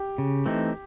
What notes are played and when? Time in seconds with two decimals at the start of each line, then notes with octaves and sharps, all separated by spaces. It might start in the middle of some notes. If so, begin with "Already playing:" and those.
Already playing: G4
0.18 C#3
0.46 E3 A3 C4 D#4